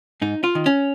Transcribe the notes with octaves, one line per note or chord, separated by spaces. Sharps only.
G#2 D#4
F4
D#3
C#4